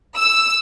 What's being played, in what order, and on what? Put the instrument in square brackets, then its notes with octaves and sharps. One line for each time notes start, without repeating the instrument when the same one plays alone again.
[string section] E6